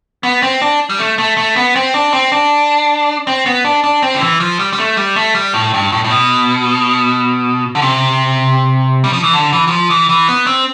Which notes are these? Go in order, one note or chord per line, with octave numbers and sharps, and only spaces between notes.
B3
C4
D4
G3
A3
A3
A3
B3
C4
D4
C4
D4
C4
B3
D4
D4
C4
D3
E3
F3
G3
G3
A3
G3
A3
G3
A2
G2
A2
A2
B2
D3
C3
G3
F3
E3
D3
E3
E3
F3
E3
E3
B3
C4